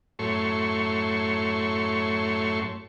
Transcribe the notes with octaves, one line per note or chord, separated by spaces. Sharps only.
F#2 A2 A3 C#5 C6 C#6